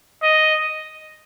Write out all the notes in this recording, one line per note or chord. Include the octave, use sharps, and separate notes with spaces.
D#5